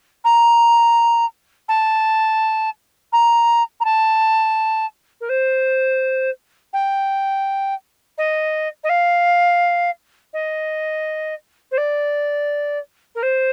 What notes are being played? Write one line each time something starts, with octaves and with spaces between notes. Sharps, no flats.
A#5
A5
A#5
A#5
A5
A#4
C5
G5
D#5
D#5
F5
D#5
C5
D5
A#4
C5